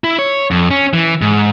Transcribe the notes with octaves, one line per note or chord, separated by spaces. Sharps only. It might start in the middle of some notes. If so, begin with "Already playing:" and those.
E4
C#5
F2
C#4
E3
G#2